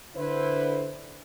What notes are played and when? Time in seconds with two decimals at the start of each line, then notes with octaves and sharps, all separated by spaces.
0.16 D3 E4 B4 C5